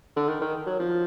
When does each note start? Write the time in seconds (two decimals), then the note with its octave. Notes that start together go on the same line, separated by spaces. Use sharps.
0.17 D3
0.28 D#3
0.41 D#3
0.66 F#3
0.79 F3